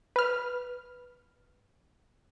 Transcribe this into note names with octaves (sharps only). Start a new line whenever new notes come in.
B4 F6